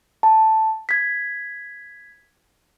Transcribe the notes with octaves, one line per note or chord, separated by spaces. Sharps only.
A5
G#6 B6